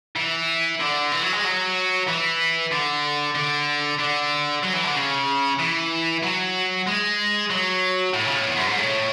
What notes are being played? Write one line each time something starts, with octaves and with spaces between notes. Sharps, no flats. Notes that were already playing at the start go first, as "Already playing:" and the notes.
E3
D3
E3
F#3
G#3
F#3
E3
D3
D3
D3
F#3
E3
D3
C#3
E3
F#3
G#3
F#3
A2
C#3
A2
E2
F#2
G#2
A2